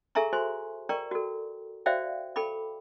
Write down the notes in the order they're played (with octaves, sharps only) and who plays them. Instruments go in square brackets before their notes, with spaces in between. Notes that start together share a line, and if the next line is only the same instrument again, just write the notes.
[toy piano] G#4 A4 E5 G#5 A#5 C#6
F#4 C5 G#5 C6
A#4 D5 G5 A#5 C#6
F#4 A4
F#4 C5 D5 E5 F5 G5
A4 G5 B5 D6